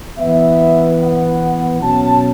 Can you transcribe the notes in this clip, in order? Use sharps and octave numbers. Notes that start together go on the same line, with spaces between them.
E3 B3 E5
F#5
B2 F#3 C#4 A5